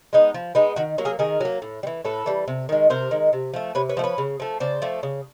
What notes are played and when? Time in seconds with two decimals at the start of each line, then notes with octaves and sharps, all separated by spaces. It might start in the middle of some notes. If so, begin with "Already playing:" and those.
0.13 G#3 B3 D#4
0.34 F3
0.55 G#3 B3 D#4
0.76 D#3 F#4
0.98 F#3 A#3
1.05 G#4 A#4
1.19 D#3 G#4 A#4
1.41 F#3 A#3
1.62 A2
1.83 G3
1.87 E3
2.05 A2 A4 B4
2.26 E3 G3
2.48 C3
2.69 D#3 G#3
2.90 C3 A#4 C5
3.11 D#3 G#3
3.33 C3
3.54 F3 A3
3.75 C3 B4 C#5
3.89 B4 C#5
3.97 F3 A3
4.04 B4 C#5
4.18 C#3
4.40 F3 A3
4.60 C#3 C5 D5
4.82 F3 A3
5.03 C#3